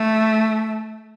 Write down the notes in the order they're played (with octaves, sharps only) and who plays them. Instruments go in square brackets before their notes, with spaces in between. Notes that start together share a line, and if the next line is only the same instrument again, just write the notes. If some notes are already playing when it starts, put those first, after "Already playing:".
Already playing: [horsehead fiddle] A3